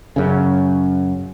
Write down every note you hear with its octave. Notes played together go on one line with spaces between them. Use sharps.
F#2 C#3